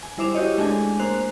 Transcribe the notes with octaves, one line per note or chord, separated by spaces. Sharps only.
G#5
G3 E4 C5 D6 E7 F7
E4 F#4 G4 C#5 D#5
G#3 A3 D4 G#5
A#3 C5 F#6 F7